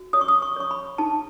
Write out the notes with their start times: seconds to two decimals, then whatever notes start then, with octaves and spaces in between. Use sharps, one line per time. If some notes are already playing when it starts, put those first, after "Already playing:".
Already playing: F#4
0.13 C#5 D#6
0.21 C#6
0.28 D#6
0.42 C#6
0.56 C#5 C#6
0.71 B5
0.98 D#4 A5